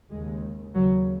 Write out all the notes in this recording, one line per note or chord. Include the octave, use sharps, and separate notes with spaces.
D#2 C#3 G#3
D#2 C#3 F#3